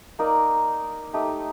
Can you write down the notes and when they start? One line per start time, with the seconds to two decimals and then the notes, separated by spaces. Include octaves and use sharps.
0.19 A#3 D#4 A#4 D5
1.13 A3 D#4 G4